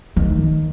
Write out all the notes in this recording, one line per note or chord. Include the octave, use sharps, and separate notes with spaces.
D#3